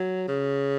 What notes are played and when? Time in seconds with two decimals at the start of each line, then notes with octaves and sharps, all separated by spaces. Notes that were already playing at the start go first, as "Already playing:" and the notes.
Already playing: F#3
0.28 C#3